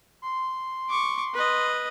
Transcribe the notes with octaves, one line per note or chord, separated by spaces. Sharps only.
C6
C#6 D6
B4 D#5